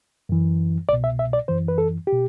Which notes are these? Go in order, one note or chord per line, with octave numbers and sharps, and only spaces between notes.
F#2 E3
C2 B2 D5
E5
E5
D5
F#2 E3 C5
B4
A4
G4
B2